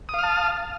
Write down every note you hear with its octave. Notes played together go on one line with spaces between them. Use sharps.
F5 A5 D#6 F6